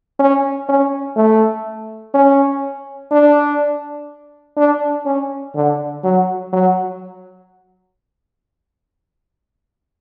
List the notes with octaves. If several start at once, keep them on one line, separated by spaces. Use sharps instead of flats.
C#4
C#4
A3
C#4
D4
D4
C#4
D3
F#3
F#3